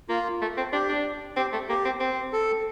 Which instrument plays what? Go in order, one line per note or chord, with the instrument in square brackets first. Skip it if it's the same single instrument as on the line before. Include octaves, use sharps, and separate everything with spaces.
[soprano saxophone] A#3 [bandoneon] F4
[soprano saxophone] A3
C4
[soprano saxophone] D4 [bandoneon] G4
[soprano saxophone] D4
[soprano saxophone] C4 [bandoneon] G4
[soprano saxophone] A3
[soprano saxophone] A#3 [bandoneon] G4
[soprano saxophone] C4
C4
[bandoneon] A4